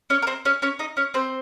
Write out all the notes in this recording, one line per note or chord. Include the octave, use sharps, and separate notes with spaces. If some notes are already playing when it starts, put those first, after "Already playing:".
C#4 C#5
A#4
C4 C5
C#4 C#5
C#4 C#5
D#4 D#5
C#4 C#5
C4 C5